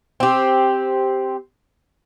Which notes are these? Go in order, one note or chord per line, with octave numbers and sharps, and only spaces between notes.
C4 G4